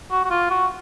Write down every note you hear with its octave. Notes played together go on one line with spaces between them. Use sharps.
F#4
F#4
F4
F#4